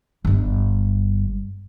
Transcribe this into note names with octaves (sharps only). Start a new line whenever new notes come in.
G1 G2